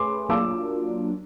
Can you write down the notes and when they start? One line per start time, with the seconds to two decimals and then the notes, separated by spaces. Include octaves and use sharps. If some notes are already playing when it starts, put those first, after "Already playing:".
Already playing: A3 C#4 G#4 B4 C6 D6
0.29 F#3 A#3 D4 F4 D6 E6